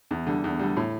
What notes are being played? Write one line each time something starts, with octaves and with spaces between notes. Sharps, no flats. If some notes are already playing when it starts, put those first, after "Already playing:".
E2
D3 G3
E2
D3 G3
A2